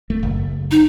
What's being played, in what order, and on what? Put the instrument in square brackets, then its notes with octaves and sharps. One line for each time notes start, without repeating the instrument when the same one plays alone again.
[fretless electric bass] D1 A3
F#1
[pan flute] D#4